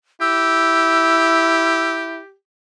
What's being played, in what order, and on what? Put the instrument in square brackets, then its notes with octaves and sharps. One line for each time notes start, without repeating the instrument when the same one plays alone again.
[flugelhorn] E4 [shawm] G4 [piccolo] E6